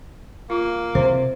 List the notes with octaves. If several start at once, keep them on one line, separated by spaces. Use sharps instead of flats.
A#3 F4
C3 C5